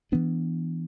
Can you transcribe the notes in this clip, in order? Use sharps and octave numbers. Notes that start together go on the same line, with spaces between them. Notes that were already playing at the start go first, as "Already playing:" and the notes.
E3 B3 D4